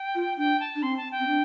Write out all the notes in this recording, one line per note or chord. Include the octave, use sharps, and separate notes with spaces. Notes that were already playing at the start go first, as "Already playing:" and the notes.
Already playing: G5
F4
D4 G5
A5
D4
C4 C6
A5
G5
C4
D4